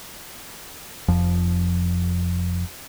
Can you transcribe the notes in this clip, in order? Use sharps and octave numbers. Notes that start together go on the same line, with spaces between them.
F1 F2 F3